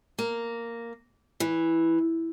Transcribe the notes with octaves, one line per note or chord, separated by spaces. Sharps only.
A#3
E3